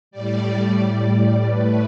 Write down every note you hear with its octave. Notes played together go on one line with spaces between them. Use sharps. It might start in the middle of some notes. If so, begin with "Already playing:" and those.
A2 G3 D5
A2 A3 B4